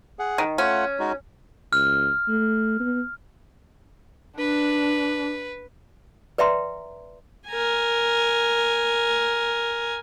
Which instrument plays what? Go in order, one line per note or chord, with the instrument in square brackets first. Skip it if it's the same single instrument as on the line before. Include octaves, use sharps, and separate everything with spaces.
[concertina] G#4 F#5
[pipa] D#3
[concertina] A3 F4 F#5 [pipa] C#4
[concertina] G#3 D#4 F#4
[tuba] C#2 [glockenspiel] F6
[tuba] A3
B3
[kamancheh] D4 [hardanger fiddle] B4
[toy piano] B4 D5 E5 G5 A#5 C6
[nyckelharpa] A#4 G#5